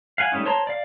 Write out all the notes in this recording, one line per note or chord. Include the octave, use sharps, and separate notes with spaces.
F5 F#5 G#5
G3 A3 B3 C#4 D#4
C5 C#5 A5 A#5 C6
D5 F5